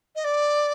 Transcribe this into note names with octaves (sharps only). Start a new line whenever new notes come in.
D#5
D5